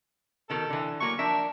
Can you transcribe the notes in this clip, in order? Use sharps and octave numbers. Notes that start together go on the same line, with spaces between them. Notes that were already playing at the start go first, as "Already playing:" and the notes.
B2 D#3 A4 A#4
D3 E3
E3 F#3 A#3 C#6
F3 D4 A#4 E5